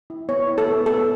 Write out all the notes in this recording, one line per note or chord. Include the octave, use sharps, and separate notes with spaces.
E4
B3 C#5
E4
A4
B3
B3 A4